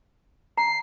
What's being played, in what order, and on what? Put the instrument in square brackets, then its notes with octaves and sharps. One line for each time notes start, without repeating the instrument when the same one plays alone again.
[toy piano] A#5 [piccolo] C7